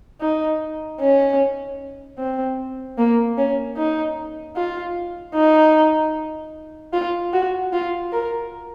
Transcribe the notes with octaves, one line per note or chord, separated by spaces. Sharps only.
D#4
C#4
C4
A#3
C#4
D#4
F4
D#4
F4
F#4
F4
A#4